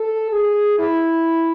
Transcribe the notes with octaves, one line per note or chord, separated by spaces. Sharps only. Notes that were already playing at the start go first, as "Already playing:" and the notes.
Already playing: A4
G#4
E4